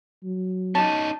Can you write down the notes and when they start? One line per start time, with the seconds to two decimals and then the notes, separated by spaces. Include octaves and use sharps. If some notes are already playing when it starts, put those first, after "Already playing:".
0.24 F#3
0.75 C#4 D#4 A5